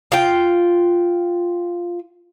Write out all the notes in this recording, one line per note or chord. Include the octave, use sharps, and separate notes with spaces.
F4 G5